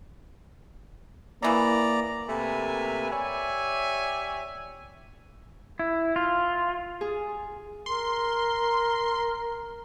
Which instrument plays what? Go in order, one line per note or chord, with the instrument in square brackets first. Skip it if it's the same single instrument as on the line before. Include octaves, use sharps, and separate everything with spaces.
[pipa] C#3 E3 F#3 [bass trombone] A#3 [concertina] D5 A#5
[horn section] C3 A3 A#3 B4 G#5
G4 C#5 D5 E5 G#5
[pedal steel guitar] E4
F4
[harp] G#4
[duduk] A#4 [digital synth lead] C6